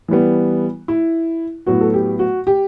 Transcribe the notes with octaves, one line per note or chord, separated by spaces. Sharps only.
E3 G3 B3
E4
A2 F#3 B3 F#4
A4
G4
F#4
G4